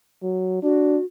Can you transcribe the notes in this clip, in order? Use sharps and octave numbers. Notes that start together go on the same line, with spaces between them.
F#3
D4 F#4